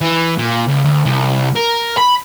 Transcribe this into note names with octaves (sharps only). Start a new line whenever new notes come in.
E3
A#2
C#2
D2
C2
A#4
B5